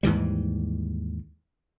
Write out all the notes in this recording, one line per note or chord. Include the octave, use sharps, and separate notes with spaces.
D#2 G#2 E3 G3